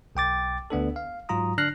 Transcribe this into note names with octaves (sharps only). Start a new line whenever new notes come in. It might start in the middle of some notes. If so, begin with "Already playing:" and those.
B1 G5 D6 A6
D2 B3 D4 A4
F5
G#2 F#3 F4 A#5 D#6
D3 D4 F6 F#6 A#6 C7